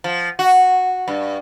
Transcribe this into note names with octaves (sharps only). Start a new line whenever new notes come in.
F3
F#4
G2